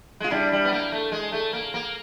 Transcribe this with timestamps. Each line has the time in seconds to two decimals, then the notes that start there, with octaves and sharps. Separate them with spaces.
0.20 G#3 F4
0.30 G3 D4 E4
0.52 G3
0.64 B3
0.72 A#3
0.92 A3
1.12 G#3
1.32 A3
1.53 A#3
1.74 A#3